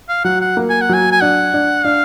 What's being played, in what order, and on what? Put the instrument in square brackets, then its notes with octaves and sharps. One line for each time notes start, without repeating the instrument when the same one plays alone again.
[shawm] F5
[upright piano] F#3 [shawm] F#5
[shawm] F#5
[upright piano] A#3
[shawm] G#5
F#5
[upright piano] F#3 [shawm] G#5
[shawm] G#5
[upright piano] D4 [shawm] F#5
[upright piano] D4
[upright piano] D4 [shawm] F5